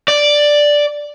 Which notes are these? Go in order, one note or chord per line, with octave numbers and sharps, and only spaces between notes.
D5